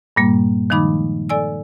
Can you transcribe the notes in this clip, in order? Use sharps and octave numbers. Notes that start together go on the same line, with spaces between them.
G2 A#2 G3 A#3
D#3 F3 G#3 D#4 B5 D6
A4 D5 G#5 E6